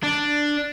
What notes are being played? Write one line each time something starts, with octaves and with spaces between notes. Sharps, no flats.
D4